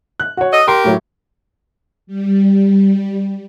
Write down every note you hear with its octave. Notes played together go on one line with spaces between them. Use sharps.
F#6
F#4 C#5
A4 D#5
G4 A#4 C6
A2 F#3
G3